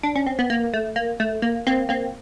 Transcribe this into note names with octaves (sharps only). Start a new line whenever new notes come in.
D4
C#4
C4
B3
A#3
A3
A#3
A3
A#3
A#3 C4
A#3 C4